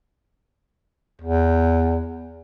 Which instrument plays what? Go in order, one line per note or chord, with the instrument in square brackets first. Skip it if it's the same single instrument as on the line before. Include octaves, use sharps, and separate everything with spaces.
[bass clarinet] E2